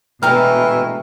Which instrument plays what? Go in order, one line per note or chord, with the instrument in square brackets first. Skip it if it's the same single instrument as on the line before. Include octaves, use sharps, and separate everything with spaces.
[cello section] B2 [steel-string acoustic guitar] D3 G#3 A3 [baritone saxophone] E3 [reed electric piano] G5 A#5 F6